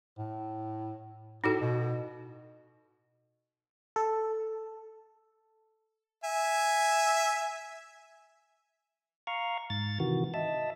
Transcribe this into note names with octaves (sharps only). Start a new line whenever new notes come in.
A2
A2 D#4 F#4 A4
B2
A4
E5 G#5
F5 A#5 C#6
G#2 A6
C3 D#3 E3 F#4
D#5 E5 A5